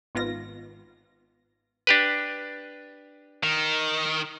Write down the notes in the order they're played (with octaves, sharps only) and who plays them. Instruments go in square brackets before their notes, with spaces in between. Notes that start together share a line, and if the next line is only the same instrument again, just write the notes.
[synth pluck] G#1 B3 F4 A#6
[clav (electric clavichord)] D4 G4 B4
[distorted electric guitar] D#3